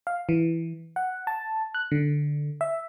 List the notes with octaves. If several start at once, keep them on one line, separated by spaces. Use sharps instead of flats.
F5
E3
F#5
A5
F#6
D3
E5